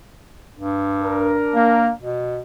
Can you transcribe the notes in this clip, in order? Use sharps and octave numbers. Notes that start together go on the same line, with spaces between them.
G2
D4 A#4
A#3
B2